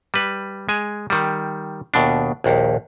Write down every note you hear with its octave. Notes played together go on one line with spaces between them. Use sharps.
G3 B4
G#3 G#5
D#3 G3
D#2 B2 D4
A#1 D#2